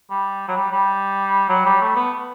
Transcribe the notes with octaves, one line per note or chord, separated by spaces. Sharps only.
G3
F#3
G3
G3
F#3
G3
A3
B3